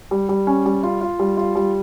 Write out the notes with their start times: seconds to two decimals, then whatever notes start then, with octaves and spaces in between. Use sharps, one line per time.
0.11 G3
0.29 G3
0.47 C#4
0.66 G3
0.83 F4
1.01 F4
1.19 G3
1.37 F4
1.55 G3